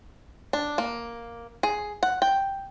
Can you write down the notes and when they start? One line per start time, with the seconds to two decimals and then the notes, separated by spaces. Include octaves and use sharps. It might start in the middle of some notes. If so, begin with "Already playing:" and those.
0.53 D4
0.78 A#3
1.63 G#4
2.03 F#5
2.22 G5